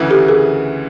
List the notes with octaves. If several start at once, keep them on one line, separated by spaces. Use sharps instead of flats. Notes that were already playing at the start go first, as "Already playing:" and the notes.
Already playing: D2 C#3 E3
G4 A4
G#4 A#4